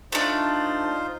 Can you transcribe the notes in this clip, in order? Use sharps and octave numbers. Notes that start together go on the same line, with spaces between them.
A3 D4 D#4 F4 C5